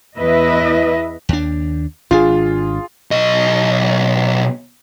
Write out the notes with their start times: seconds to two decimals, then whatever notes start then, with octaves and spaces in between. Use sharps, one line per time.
0.17 E2 E4 B4 D#5 E5
1.29 D#2 D4
2.11 G#1 D4 F4 G#4
3.11 B1 D#5